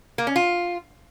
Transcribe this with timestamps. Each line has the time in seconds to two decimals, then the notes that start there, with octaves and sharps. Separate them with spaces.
0.18 A#3
0.27 C#4
0.36 F4